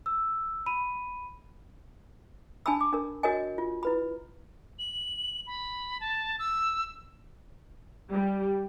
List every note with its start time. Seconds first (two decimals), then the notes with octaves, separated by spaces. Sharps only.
0.06 E6
0.66 B5 D#7
2.66 D4 G#5 A5 B5 E6
2.81 D6
2.93 D4 A#4
3.23 F#4 A#4 C#5 D#5 G#5
3.58 F4
3.83 E4 B4 B5
4.79 F#7
5.47 B5
6.00 A5
6.39 E6
8.11 G3